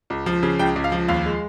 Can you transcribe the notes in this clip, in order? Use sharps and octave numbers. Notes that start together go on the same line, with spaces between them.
C#2
F3
C#3
C#2 G5
C#2
F5
F3
D#2 F5
G#3